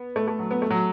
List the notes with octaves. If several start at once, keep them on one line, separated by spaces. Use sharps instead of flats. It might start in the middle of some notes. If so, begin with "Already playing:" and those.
Already playing: B3
A3
A3
F#3
B3
A3
F#3